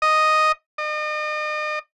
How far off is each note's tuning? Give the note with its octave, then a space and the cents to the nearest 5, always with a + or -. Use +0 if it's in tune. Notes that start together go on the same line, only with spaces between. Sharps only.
D#5 +0
D#5 -40